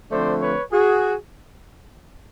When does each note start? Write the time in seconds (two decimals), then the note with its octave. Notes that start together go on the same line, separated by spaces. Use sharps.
0.11 D3 F3 A3 C4 C5 D5
0.41 B4 C#5
0.71 F#4 G#4